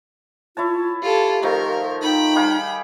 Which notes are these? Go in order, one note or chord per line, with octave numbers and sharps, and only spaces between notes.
E4 F4 C#5 A5
F4 G4 A4
D#3 F3 A3 A#4
D#4 G5 B5
G3 G#4 F5